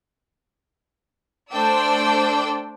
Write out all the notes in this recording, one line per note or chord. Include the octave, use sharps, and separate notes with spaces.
A3 D4 C5 D5 G5 E6